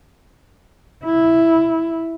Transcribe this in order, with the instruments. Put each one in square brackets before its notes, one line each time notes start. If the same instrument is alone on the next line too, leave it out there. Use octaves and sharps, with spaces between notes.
[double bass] E4